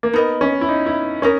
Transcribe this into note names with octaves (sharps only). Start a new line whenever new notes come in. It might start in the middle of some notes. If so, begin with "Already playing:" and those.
A#3
B3 D#4 A#4 D#5
C#4
E4
D#4
E4
C#4 D#4 A#4